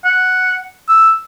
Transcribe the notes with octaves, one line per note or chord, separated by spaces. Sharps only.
F#5
E6